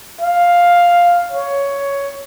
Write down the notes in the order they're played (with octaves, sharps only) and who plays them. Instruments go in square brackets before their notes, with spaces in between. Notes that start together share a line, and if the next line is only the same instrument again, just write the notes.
[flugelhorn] F5
C#5